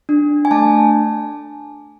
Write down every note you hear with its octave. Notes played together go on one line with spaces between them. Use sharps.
D4
G#5
A3 A5